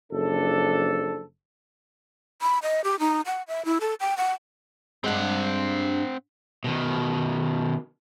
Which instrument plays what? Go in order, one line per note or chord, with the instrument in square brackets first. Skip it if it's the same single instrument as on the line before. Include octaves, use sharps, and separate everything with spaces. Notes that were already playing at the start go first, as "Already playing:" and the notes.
[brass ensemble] F#1 F3 D4 A4
[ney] B5
D#5
G4
D#4
F#5
E5
E4
A4
G5
F#5
[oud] G2 G#3 [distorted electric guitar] C4 F#5
[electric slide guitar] B2 D#3